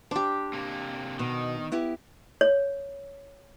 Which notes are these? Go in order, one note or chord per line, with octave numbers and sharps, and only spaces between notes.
D4 G4 C5
C3 A#3
B2 D#3
B3 E4 G4
C#5